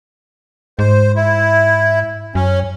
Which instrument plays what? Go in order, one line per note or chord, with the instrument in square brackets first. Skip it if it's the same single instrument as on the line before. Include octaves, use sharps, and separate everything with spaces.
[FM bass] G#2 [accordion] C5
[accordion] E4
[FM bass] F#2 [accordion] C#4